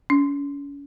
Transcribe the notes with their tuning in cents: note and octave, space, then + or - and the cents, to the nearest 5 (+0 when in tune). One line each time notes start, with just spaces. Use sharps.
C#4 +35